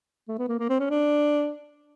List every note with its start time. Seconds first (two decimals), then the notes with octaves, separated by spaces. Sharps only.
0.28 A3
0.38 B3
0.48 A#3
0.59 A#3
0.69 C4
0.79 C#4
0.90 D4